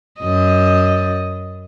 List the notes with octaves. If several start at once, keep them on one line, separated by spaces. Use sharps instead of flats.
F#2 D#5